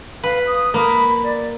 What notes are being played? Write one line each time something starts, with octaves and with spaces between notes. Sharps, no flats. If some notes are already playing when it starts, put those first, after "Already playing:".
B4 F5
D#6
A#3 B5
D5